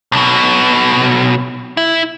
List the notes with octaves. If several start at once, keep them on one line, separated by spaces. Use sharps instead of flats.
B1 B2
E4